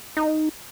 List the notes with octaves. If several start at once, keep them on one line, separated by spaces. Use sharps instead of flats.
D#4